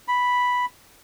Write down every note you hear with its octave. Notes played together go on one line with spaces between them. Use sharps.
B5